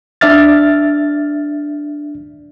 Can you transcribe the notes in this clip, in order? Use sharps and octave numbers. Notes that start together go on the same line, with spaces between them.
D4 D5 E5 F6 A6